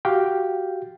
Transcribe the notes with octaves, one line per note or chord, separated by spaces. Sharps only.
F#4 G4 F5 G5